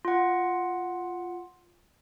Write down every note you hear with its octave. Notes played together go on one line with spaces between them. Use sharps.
F4 F#5